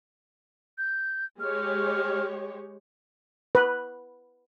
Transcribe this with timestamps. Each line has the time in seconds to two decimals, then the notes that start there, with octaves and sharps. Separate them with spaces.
0.78 G6
1.40 G#3 G4 C#5 F6
3.55 B4